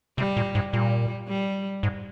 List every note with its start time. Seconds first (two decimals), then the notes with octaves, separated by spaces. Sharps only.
0.18 C3 G3
0.37 A#2
0.55 G#2
0.73 A#2 G3
1.28 G3
1.83 G#2